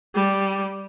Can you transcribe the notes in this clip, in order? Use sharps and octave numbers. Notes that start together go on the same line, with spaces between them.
G3